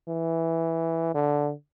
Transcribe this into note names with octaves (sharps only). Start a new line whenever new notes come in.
E3
D3